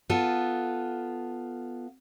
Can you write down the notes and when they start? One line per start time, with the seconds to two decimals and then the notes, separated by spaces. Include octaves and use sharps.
0.09 B3 F4 A4